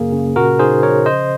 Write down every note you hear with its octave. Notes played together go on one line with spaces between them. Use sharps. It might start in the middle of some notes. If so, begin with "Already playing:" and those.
Already playing: F#2 C#3 A#3 G#4
C#3
A#2 F#4 A#4
D#4 G#4 C5
F3 A#4 C#5
C#3 C5 D#5